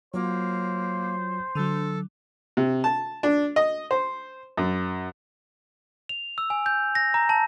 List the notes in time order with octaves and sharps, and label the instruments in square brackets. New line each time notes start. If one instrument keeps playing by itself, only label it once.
[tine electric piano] F#3 F4 C#5 [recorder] A#3 [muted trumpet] C5
[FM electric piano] D3 F#3 [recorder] A4
[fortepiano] C3
A5
D4
D#5
C5
F#2
[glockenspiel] F7
E6
G#5
G6
A#6
A#5
A5